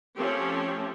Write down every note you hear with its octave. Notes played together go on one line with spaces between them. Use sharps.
F3 A3 C4 C#4 G4